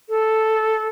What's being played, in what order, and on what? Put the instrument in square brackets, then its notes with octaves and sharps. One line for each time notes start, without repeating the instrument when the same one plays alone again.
[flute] A4